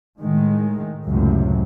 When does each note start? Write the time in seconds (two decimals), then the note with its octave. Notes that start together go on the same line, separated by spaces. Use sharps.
0.21 A2 D#3 G#3
1.08 C#2 F#2 A2 C3